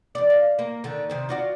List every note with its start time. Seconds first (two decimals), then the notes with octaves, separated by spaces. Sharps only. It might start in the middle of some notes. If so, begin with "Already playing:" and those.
0.15 E2 D5
0.30 F5
0.59 A#3
0.84 D3 D#3
1.10 C3 D#3 C4
1.29 F4 F#4 D5